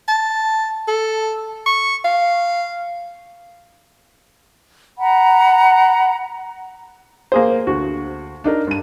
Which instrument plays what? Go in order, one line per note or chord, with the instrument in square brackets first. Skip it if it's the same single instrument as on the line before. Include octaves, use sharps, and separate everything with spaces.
[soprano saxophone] A5
A4
C#6
F5
[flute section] F#5 A#5 B5
[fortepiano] A#3 G#4 C5
[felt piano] D2 [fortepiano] F#4
[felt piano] D4 D#4 A#4
G2 D#7